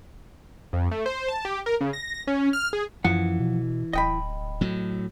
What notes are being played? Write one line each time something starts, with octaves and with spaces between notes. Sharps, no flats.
F2
A3
C5
A5
G4
A#4
C#3
A#6
C#4
F6
G#4
F#2 E3 F3 F#5
B2
D1 D#5 G5 B5
A2 F#3